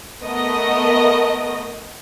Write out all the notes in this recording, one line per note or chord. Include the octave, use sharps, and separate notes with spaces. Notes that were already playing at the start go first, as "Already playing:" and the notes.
A3 B3 A#4 D#5